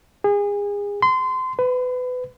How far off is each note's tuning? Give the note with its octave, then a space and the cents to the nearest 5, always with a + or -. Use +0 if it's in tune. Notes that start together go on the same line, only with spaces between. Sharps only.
G#4 -30
C6 -25
B4 +25